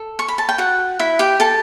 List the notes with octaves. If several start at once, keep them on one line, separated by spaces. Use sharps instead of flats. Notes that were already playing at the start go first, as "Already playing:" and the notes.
Already playing: A4
C#6
B5
A5
G5
F#4 F#5
E4 E5
G4 G5
A4 A5